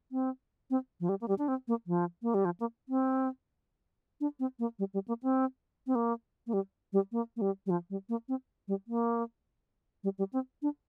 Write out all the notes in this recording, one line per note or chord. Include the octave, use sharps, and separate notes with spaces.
C4
C4
F3
G3
A#3
G3
D4
C4
A#3
F3
A#3
G3
F3
A#3
C4
D4
C4
A#3
G3
G3
A#3
C4
C4
A#3
A#3
G3
G3
A#3
A#3
G3
G3
F3
G3
A#3
C4
G3
A#3
G3
G3
C4
D4